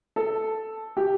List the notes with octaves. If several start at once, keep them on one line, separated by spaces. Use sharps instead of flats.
A4
G4